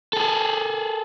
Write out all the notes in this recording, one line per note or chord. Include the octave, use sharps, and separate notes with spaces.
G#4 A4